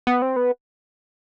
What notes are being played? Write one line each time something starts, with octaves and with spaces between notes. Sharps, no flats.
B3
C4
B3